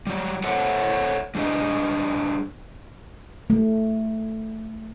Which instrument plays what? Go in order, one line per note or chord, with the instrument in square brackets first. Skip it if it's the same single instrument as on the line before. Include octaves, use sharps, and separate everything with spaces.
[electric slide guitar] F#3 G3
A4 C5 C#5 E5 F#5
G3 D4 G#4 D#5
[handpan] A3